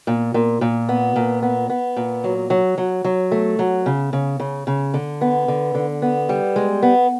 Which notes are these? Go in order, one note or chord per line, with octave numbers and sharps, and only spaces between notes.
A#2
A#2
A#2
B3
A#2
B3
B3
A#2
F#3
F#3
F#3
F#3
A3
F#3
C#3
C#3
C#3
C#3
D3
B3
D3
D3
B3
G3
G#3
B3